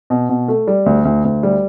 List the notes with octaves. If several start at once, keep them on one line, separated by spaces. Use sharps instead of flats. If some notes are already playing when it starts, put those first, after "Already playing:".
B2
B2
A3
G3
D2
D2
D2
G3